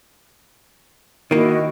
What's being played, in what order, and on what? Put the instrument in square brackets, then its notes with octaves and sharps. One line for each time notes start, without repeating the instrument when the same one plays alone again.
[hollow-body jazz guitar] D#3 A#3 [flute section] E4 F#4 D#5